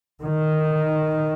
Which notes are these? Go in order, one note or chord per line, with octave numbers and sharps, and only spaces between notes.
D#3